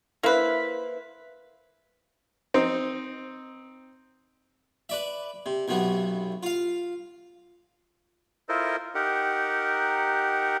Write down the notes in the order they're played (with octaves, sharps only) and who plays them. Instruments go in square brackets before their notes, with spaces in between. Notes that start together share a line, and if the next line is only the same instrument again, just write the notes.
[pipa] A#3 B4 [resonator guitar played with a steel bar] E4 C5
[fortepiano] C4 D#4
[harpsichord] B4 D5 E5
C3
B1 F#2 C3 B3
F4 F5
[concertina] E4 F4 A4 A#4 C5 D#5
D#4 G4 A#4 F#5